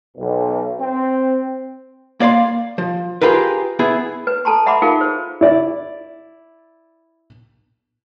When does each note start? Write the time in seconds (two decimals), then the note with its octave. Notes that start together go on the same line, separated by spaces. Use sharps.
0.17 B1
0.79 C4
2.20 A#3 D5 F5 C6
2.78 F3
3.22 F4 G4 G#4 A#4 B4
3.79 B3 E4 G#4
4.27 B4
4.45 A4 A5 A#5 C6
4.66 E5 F#5 B5 C6 D6
4.82 D#4 F4 G#4 A#4 F5
5.01 C5
5.41 E4 D5